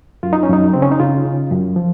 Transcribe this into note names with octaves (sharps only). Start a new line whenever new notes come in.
F#2 F4
D#4
C#4
F#2 D#4
C#3 C4
C#4
D#4
C#3 F4
C#3
F#2
F3